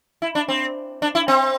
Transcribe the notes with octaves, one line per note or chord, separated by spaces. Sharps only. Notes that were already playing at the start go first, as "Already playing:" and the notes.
E4
D4
C4
D4
E4
C4